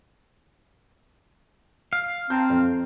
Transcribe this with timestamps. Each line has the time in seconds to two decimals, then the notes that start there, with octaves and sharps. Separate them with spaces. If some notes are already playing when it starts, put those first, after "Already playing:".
1.93 F5
2.30 C4 A5 A#5 G6
2.50 F2